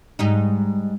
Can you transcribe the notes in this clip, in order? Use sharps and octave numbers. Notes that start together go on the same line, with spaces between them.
G#2 G3 D#4